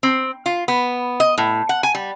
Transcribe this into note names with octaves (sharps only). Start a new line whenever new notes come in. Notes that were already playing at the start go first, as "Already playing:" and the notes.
C4
F4
B3
D#5
A2
F#5
G#5
G3